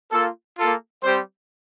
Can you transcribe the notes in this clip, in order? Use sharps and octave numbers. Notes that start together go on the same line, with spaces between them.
A#3 F4 A4
A#3 F4 A4
G3 C4 G4 C5